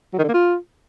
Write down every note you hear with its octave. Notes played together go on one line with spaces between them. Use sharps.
F#3
D#3
D3
A#3
F4